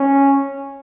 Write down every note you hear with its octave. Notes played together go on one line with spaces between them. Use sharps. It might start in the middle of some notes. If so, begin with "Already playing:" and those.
Already playing: C#4